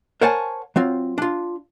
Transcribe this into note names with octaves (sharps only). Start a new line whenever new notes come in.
A#4 C5 C#5 F#5 G#5 A5
F#3 C4 F4
D4 F4